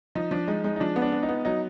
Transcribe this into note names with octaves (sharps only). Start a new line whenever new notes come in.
F3 D#4
F3 D4
G#3 D#4
G#3 D#4
D#4
F3 D4
B3
D4
B3
D#4
B3
F#3 D#4